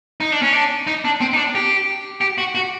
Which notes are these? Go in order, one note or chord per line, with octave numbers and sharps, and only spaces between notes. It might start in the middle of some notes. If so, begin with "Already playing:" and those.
D#4
D4
C#4
D4
D#4
D4
C4
D#4
D4
G4
G4
F#4
F#4